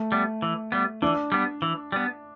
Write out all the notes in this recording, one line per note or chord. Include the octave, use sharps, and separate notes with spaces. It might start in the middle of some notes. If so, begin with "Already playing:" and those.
Already playing: A3
G3 B3
E3
G3 B3
E3 D4
G3 B3
E3
G3 B3